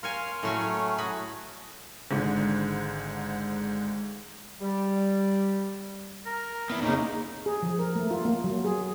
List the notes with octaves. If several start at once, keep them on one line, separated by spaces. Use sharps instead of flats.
A#4 C#5 F5 G#5 C6
A2 F#3 A3 C#4 C#5 G#5
F#4 G#4 B5
G#1 G#2 D3
G3
A#4
B3 E4
F2 A#2 C#3 A#3 C#4 D#4
G#4
F3
A#4
A3
F4
A#3
F#3
G#4